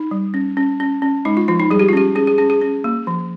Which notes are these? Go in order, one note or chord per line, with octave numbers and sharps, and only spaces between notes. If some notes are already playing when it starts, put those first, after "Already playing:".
Already playing: D#4
G3
C#4
C#4
C#4
C#4
G#3 D#4
F4
F3 F4
D#4
G3 G#4
G4
F4
C#4 G4
C#4 G#4
G#4
C#4 G#4
G#4
C#4
A#3
F3